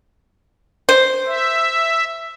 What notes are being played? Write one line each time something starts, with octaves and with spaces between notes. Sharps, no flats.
C5
E5